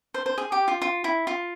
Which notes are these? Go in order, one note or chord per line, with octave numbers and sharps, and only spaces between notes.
C5
C5
G#4
G4
F4
F4
E4
F4